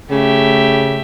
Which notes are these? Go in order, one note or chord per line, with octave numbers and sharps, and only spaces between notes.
C#3 A3 G4 E5